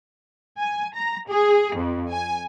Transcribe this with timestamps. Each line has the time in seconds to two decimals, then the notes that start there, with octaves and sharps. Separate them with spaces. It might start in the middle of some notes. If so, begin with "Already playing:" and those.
0.59 G#5
0.95 A#5
1.28 G#4
1.76 F2
2.12 G#5